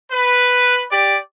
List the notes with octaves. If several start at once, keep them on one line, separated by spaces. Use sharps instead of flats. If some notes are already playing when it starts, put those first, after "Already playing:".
B4
G4 D5